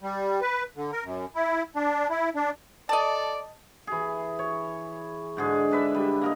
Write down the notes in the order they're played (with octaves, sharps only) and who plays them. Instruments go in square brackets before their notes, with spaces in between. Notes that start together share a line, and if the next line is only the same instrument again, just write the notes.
[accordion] G3
B4
D3
A#4
F#2
E4
D4
E4
D4
[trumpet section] A4 D5 [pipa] D#5 A5
[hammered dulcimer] E3 G#4
C#5
G#2 D3 G#4
D4 B4 E5
G3
A#3 A#4 D#5